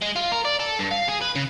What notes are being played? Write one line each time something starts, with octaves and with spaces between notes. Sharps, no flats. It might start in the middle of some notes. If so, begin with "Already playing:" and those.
G#3
F4
A#4
D5
A4
G2
F5
G#4
B4
C#3